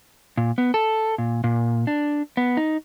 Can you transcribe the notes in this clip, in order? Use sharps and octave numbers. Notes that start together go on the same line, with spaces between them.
A#2
B3
A4
A#2
A#2
D4
B3
D#4